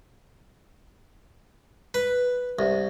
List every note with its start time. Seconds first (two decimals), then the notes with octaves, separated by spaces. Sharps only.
1.94 B4
2.59 C2